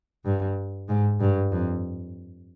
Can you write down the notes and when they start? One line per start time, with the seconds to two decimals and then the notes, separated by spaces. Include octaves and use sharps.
0.25 G2
0.89 G#2
1.20 G2
1.52 F2